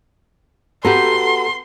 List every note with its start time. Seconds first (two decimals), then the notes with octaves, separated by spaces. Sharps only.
0.85 B3 F#4 G4 A4 A#5 C6